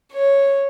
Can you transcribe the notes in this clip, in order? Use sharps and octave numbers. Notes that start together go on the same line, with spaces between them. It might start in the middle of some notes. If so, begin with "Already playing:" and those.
C#5